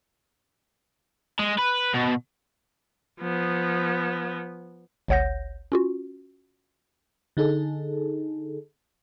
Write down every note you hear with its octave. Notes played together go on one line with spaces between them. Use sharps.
G#3
B4
B2
F3 B3
G1 C#2 C#5 F#5 G6 A#6
C#4 F4 F#4
D3 D#4 G#4 A4